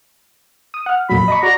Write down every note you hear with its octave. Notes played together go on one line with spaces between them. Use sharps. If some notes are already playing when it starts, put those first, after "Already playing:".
D#6
F#5 F6
F2 A#2 F#3 B5
D#5 A#5 C#6
F#4 D5 A#5